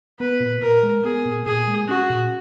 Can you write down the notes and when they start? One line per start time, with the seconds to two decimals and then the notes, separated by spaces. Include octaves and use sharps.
0.19 B3 B4
0.40 A#2
0.62 A#2 A#4
0.83 G#3
1.04 B3 G#4
1.25 A#2
1.46 A#2 G#4
1.67 G#3
1.88 C#4 F#4
2.10 A#2